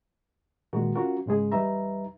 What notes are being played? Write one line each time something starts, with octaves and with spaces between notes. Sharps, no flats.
A#2 D3 D#3 G#3 F#4 A#4
C#4 F4 F#4 A#4
G#2 C#3 G#3 G#4
E2 G3 D#4 B4 E5 A#5